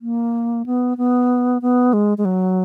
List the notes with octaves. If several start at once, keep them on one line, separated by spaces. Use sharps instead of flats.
A#3
B3
B3
B3
G#3
G#3
F#3